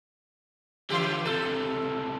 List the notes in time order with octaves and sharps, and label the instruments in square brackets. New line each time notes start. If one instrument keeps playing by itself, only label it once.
[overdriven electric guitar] D3 F4 [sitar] E3 G4
[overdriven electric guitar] C#2 C3 [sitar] A4